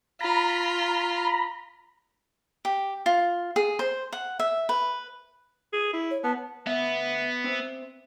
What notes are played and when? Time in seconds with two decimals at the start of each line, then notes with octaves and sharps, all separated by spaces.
0.21 F4 A#5 B5
2.65 G4
3.06 F4
3.56 G#4
3.79 C5
4.13 F#5
4.40 E5
4.69 B4
5.73 G#4
5.93 E4
6.11 C#5
6.23 B3 A5
6.67 D2 G#2 B3 E5
7.44 C4 C5 E5